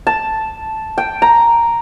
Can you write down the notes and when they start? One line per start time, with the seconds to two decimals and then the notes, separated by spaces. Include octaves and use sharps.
0.07 A5
0.98 G5
1.22 A#5